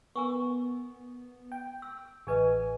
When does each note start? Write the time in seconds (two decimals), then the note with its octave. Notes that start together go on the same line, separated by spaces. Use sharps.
0.16 B3 A#4 G#5 C#6
1.52 G5
1.82 E6
2.27 A1 G#4 B4 D#5 G#5